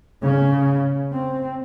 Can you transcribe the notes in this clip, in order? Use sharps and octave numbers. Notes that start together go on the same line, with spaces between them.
C#3 C#4
C4